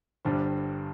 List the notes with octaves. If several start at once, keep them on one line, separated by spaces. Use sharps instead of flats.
G1 G2 D3 G3 D4 C5